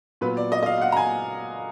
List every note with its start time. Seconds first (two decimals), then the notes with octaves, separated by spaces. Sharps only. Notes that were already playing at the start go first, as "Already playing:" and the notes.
0.21 A#2 F#3 B3 B4
0.37 D5
0.52 D#5
0.63 D#5
0.66 F5
0.78 F5
0.81 F#5
0.92 A#5
0.97 G#5